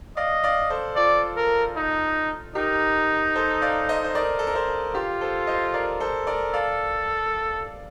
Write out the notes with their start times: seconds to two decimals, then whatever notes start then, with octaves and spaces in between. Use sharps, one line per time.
0.17 D5 D#5 F5
0.43 D5 F5
0.70 A4 C5
0.96 F4 A4 D5
1.36 A#4
1.76 D#4
2.55 D#4 G4 A#4
3.35 A4 C5
3.62 D5 F5
3.89 C5 D#5
4.04 C5
4.15 A#4 D5
4.39 A4
4.47 A#4
4.55 A4 C5
4.94 F4 G4
5.21 A4 C5
5.47 C5 D#5
5.74 A#4 D5
6.00 A4 C5
6.27 A#4 D5
6.54 A4 D5 F5